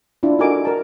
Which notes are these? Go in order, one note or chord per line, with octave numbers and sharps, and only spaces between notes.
D4 E4 F4
D#4 F#4 A4 A#4 G#5 D6
A#4 A5